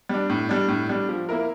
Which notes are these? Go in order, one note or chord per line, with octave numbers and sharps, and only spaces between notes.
G3 D4
A2
G3 D4
A2
G3 D4
F3
A#3 E4 A#4